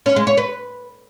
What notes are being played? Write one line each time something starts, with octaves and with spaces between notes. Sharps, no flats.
C#4
G#3
C#5
B4